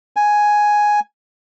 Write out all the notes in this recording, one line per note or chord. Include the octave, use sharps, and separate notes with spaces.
G#5